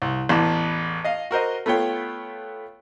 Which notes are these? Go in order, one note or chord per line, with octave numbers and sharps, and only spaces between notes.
C2
A1 E2 B3 A5 D6
D#5 F5
F#4 A#4 C5 D#5
A3 B3 F4 C#5 G5